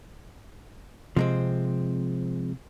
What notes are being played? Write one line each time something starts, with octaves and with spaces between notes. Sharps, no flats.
C3 F3 G#3 C4